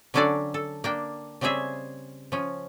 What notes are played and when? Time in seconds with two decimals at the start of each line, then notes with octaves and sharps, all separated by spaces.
0.14 D3 F#3 C#4 D4 A4 D5
0.54 A4
0.84 A#3 D4 G5
1.41 C#3 G3 C4 C#4 G#4 E5
2.32 F3 C#4